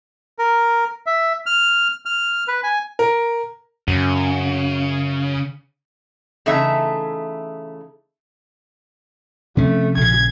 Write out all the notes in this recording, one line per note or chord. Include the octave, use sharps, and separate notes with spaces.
A#4
E5
F6
F6
B4
G#5
A#4
F#2 C#3
C#3 E3 A3 D#4 E5
C3 F3 A3 C#4
A#1 C#3 G#6